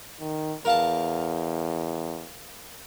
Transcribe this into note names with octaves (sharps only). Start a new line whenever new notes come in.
D#3
E2 A#4 F5 A5